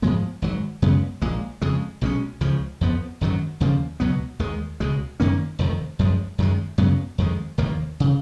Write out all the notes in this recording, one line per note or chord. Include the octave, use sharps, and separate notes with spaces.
G#2 F3 G#3 B3
G#1 G#2 F#3
F#2 C#3 G#3 B3
A#1 A#2 G#3
F2 C#3 G#3
B1 B2 G#3 C#4
C#2 C#3 F3
F2 F3 B3
G#1 F#2 D#3 F#3
D#2 C#3 F3 A#3
C#2 B2 F#3 B3
D#2 D#3 G#3
C#2 B2 G#3
F#2 D#3 A#3 C#4
F1 F2 D#3
F#2 F3 G#3
F#2 D#3 G#3
F#2 C#3 F#3 B3
F2 D#3 G#3
F1 D#2 D#3 A#3
C#3